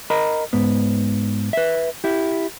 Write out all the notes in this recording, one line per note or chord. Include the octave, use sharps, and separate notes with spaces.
A#4 D#5 A#5 B5
G#2 B3
B4 E5
E4 G4